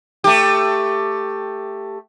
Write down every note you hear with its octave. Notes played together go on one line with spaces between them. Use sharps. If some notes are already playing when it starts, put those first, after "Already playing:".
A3 G4